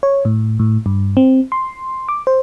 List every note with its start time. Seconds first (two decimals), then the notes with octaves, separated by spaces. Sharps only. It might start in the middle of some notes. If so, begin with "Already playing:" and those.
0.03 C#5
0.25 A2
0.59 A2
0.86 G2
1.17 C4
1.52 C6
2.09 D6
2.27 C5